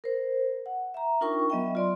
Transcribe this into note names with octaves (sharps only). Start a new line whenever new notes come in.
A#4 C5
F#5
E5 A#5
D4 D#4 F4 A#4 G5 C#6
F#3 B3 D#5 E5 G5
F4 D5 C6